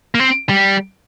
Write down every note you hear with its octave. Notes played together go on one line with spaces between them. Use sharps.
A#3
C4
G3